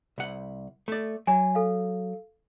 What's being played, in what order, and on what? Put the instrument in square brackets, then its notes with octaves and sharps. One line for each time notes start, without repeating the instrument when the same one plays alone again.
[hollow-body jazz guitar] C2 F#5
A3 D5
[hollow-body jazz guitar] F#3 [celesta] G#5
[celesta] A4 F5